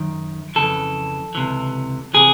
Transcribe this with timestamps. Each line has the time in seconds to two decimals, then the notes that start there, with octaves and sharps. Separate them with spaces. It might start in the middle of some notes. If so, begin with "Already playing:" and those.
Already playing: F#2 D#3
0.55 F2 C#3 E3 A4
1.35 C#2 C3 E3
2.14 C3 E3 G#4